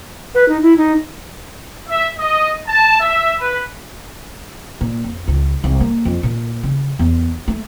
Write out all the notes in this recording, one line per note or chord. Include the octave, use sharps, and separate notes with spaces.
B4
D#4
E4
D#4
E5
D#5
A5
E5
B4
A#2
F2
C#2
C2
A#3
F2
A#2
C#3
E2
A3